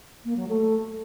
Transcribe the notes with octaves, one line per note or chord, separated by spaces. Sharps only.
A#3
F#3
A3